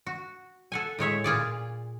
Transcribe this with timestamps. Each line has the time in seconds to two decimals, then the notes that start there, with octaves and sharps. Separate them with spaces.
0.06 F#4
0.72 A4 F#5 G#5
0.99 A2 G#3 C#5 E5
1.24 A#2 F4 G#4 D5